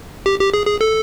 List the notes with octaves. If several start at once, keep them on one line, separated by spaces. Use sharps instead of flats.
G4
G4
G#4
G#4
A4